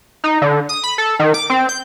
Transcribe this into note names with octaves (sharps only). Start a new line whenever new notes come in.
D#4
D3
D#6
B5
A4
D#3
D6
C4
G6